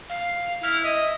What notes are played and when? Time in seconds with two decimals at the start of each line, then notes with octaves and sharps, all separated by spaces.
0.09 F5
0.63 E4 F6
0.84 D#5 E5